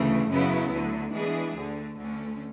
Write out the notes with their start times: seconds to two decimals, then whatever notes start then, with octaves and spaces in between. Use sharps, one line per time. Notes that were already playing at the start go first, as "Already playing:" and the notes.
Already playing: D2 C#3 E3 A3
0.29 F#2 C#3 F#3 B3 E4
0.71 D2 D3 F#3
1.13 E3 G#3 B3 D4 G#4
1.55 D2 D3 A3
1.97 D2 D3 A3 C#4